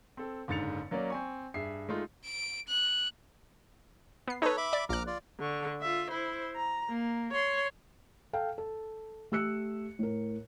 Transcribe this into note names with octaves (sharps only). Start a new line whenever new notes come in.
C4 A4
F#1 G#2 D3 A6 C#7 F7
F#3 A#3 C#4 D5
C4 G#5 C#6
G2 G#4 E5 C7
G#3 A3 D#4 F4
D7
F#6
B3 C7
D#4 A4 B4 C#5
E5 B5 D6
D5
A#1 A#5 D6 F6 F#6
F4 D5
D3 C#6
F4 E5
E4 C5
A#5
A#3
C#5 C6
A4 F5 G5
A4
A3 G4 E6 F#6 C#7
A2 A#4